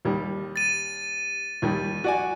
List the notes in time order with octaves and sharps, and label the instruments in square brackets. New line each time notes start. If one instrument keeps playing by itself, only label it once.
[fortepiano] D#2 G3
[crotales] A6 D#7
[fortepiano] D#2 G3
F#4 D5 G#5